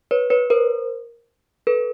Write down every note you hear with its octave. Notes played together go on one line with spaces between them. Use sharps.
B4 C#5
B4 C#5
A#4 C5
A4 B4